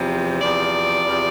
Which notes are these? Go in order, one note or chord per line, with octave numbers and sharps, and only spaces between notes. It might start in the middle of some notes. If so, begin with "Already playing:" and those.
Already playing: E2 C3 F3
E2 C3 F3 D5
E2 C3 F3